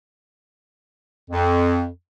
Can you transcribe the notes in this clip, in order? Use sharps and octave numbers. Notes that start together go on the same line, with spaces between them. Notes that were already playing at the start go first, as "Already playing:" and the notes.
F2